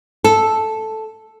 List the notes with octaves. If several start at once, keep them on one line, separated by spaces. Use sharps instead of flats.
A4